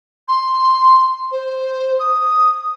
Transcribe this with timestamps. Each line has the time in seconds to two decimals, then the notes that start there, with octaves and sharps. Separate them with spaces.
0.28 C6
1.32 C5
2.00 D#6